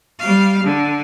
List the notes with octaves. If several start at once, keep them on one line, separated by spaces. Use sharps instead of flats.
G3 F5
D3